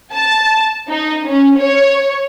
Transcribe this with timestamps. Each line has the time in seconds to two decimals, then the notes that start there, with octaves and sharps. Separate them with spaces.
0.13 A5
0.88 D#4
1.26 C#4
1.58 C#5